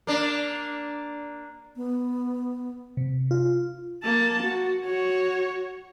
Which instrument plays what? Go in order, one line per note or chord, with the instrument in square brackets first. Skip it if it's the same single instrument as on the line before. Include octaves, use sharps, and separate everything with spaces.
[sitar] A#3 D4
[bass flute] B3
[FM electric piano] C3
F4
[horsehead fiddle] A#3 A5
F#4
F#4 C#5